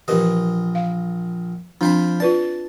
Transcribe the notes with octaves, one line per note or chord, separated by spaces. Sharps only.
A#1 E3 G4 A#4 D#5
F5
F3 C4 D4 C5 B5
F4 B4 D5 A5